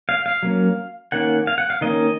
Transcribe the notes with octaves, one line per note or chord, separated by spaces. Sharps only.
F5
F5
F#3 A#3 C#4
D#3 A#3 C#4 F#5
F5
F#5
F5
D#3 A#3 C#4 D#5